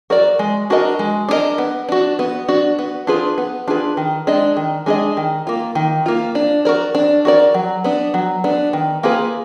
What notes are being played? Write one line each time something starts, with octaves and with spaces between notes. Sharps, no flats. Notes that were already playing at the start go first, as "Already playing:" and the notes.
F#4 A#4 D5
G#3
D4 F#4 A#4 D#5
G#3
D4 F#4 A#4 D#5
B3
D4 F#4
B3
D4 F#4
B3
D4 F4 G#4 B4
B3
D4 F4 G#4 B4
D#3
G#3 D4 G#4 D#5
D#3
G#3 D4 G#4 D#5
D#3
A#3 F4
D#3
A#3 F4
D4
F#4 A#4 D5
D4
F#4 A#4 D5
F#3
B3 D4
F#3
B3 D4
D#3
A#3 F4 G#4 B4